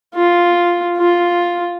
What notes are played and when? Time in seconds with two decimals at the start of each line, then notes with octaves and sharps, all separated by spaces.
0.15 F4
0.97 F4